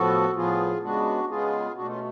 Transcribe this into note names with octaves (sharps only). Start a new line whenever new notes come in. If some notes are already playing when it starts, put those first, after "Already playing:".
Already playing: A2 F3 B3 F#4 A4
A2 F3 B3 F4 G#4
C#3 G#3 B3 D4 F#4
C#3 G#3 B3 F4 G#4
B2 A3 D4 F#4
C#4 F4